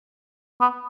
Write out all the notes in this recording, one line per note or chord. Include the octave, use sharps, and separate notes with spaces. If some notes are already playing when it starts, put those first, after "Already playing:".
B3